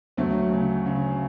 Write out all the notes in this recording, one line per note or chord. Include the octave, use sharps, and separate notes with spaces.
D2 F#3 A3
C#3
C#3